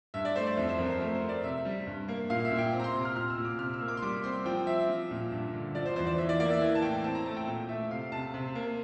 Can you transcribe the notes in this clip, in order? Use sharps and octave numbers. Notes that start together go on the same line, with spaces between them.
G2 E5
D5
A3 C5
D5
F2 E5
C5
F2 A#4
C5
A3 A#4
C5
C4
D5
C3 E5
G3
G2
A#3
A#2 F5
E5
A#2
G5
C4
A#5
C6
C3
F6
A#2 F6
E6
A#2
D6
C3 F6
E6
A#3
D6
C6
G3 D6
C4 C6
F3 G5
C4 E5
F3
A#2
G2
D3
F3 D5
C5
E2 C5
D5
E3 E5
D5
A#3 D5
E5
E3
A5
A2 G5
C4 A5
A#5
A3 A5
G5
A#2 G5
A3 E5
C3 F5
C3 A5
C3
A#3